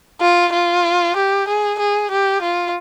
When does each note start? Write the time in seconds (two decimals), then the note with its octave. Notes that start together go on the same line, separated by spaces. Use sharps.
0.21 F4
0.53 F4
1.16 G4
1.48 G#4
1.79 G#4
2.11 G4
2.42 F4